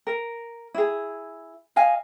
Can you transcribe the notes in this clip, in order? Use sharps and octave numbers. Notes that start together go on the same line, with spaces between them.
A#4
E4 G#4
D#5 F5 G#5